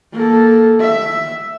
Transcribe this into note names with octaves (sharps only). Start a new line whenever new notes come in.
A#3 A4
E5